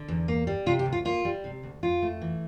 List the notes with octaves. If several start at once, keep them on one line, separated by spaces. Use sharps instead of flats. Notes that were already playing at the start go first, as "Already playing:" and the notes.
Already playing: D3
E2
A#3
G3
C3 F4
G4
D2
F4
A#3 F4
G3
C3
D2
F2 F4
A3
E3